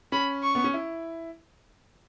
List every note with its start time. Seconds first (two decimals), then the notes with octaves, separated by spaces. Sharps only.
0.12 C#4 B5
0.43 C#6
0.55 B3
0.64 C#4
0.74 E4